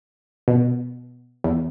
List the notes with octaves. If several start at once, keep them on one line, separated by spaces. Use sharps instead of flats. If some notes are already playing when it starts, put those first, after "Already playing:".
B2
E2